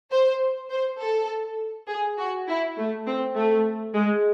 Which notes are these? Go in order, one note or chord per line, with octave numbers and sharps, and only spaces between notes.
C5
C5
A4
G#4
F#4
E4
A3
C4
A3
G#3